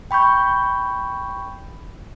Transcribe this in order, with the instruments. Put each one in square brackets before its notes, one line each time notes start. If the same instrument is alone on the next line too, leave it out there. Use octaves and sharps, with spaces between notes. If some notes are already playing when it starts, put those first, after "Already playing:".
[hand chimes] G5 B5 C#6 G6